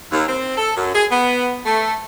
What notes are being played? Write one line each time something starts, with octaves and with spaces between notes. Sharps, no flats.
D#2
C4
A4
F#2
G#4
B3
A3